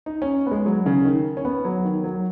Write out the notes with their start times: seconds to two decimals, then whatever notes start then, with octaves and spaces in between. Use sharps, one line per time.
0.06 D#4
0.22 C#4
0.46 B3
0.51 G#3
0.66 F#3
0.86 C#3
1.05 D#3
1.37 C#4
1.45 B3
1.65 F#3
1.84 D#3
2.04 F#3